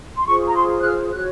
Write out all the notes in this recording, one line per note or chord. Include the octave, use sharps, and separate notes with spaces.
C6
F4 G#4 C5 C#6
A#5
C6
F#6
F6
F#4 C#5 F#6